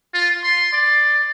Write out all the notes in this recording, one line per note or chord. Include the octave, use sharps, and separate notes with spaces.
F4
C6
D5